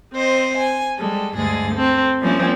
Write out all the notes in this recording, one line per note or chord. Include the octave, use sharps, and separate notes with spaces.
C4 C5 D#5
G#5
G3 G#3 A4
D2 G2 G#3 G#4 A6
C4 A4
F3 G3 A#3 C4 C#4 E4